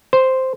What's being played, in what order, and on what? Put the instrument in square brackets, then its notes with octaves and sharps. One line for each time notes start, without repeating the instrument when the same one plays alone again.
[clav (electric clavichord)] C5